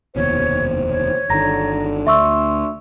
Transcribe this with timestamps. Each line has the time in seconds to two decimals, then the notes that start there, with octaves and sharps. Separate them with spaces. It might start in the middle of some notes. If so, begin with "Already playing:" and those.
0.16 F1 D#2 B2 C5 C#5
0.90 C#5
1.30 G1 D3 D#3 A#5 A#6
2.07 D2 E5 C6 C#6 E6